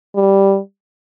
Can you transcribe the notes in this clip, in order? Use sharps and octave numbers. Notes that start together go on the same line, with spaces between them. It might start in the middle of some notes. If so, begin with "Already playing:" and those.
G3